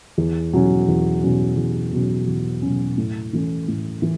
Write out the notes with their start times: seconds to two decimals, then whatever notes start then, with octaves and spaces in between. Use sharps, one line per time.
0.18 E2
0.53 B2 F#3 C#4
0.88 E2
1.22 B2 F#3 C#4
1.57 E2
1.93 B2 F#3 C#4
2.27 E2
2.62 B2 F#3 C#4
2.97 A2
3.33 E3 A3 C#4
3.68 A2
4.02 E3